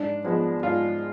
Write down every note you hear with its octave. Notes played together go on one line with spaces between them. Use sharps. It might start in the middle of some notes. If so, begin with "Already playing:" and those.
Already playing: G#2 D4
F3 G#3 B3
G#2 F4